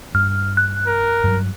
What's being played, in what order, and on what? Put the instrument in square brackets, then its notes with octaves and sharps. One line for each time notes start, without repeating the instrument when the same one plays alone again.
[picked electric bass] G2 [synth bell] F6
[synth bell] F#6
[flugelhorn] A#4
[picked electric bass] G2 F#3